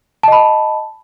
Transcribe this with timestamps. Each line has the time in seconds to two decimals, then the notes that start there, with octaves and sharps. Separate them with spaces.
0.23 A5
0.28 D#5
0.32 B5